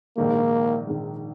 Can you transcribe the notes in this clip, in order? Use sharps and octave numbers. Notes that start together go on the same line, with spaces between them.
A#1 G#2 D#3 G#3 A#3 D#4
A#1 G#2 D#3 G#3 D#4